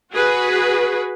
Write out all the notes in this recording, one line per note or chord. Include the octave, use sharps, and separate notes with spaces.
F#4 G#4 B4